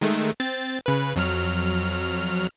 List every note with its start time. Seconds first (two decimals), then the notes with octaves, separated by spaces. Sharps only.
0.01 D#3 G#3 A3
0.40 C4 A6
0.86 C#3 B4
1.16 F2 F#3 F6